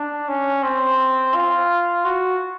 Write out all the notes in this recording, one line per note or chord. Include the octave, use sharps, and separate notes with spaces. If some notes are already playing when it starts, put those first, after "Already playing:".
Already playing: D4
C#4
C4
F4
F#4